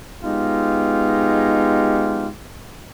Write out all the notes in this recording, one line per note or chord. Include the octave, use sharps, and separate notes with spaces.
G#3 B3 D#4 F4 G4